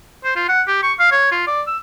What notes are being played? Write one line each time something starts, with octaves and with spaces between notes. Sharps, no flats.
C5
F4
F#5
G4
C#6
F5
C#5
F4
D5
E6